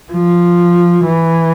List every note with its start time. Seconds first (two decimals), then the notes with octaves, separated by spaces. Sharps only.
0.12 F3
1.06 E3